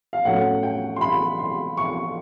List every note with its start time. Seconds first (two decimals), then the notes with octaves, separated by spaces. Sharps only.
0.13 F5
0.25 A2 F#3 A3 C#4 F#5
0.63 G5
0.96 C6
1.01 B5
1.39 C6
1.77 C#6